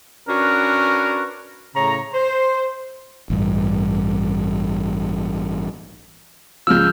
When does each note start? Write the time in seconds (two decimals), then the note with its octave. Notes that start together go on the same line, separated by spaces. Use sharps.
0.28 C#4 D4 F#4 A#4 B4
1.76 A2 C#3 C#5 A#5
2.14 C5
3.30 A1 G2
6.67 C#2 F3 E6 F6 G6